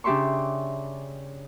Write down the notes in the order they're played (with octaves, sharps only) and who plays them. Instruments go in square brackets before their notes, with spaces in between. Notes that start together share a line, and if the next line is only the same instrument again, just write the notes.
[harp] C#3 D4 G4 E5 C6 C#6